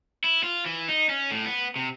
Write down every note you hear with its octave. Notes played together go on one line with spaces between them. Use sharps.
E4
F4
E3
D#4
C#4
A2
B3
C3